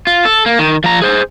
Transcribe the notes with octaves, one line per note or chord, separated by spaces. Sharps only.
F4
A4
A#3
D#3
F3 A#5
G#4 C5